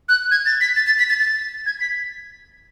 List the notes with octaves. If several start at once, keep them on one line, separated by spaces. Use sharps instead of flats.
F#6
G#6
A6
B6
A6
A6
B6
A6
A6
G#6
B6